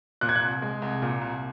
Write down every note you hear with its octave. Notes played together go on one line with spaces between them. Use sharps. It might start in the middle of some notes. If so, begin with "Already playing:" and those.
A#2 F#6
G#6
F#6
C2
G#3
C2
A#2
C2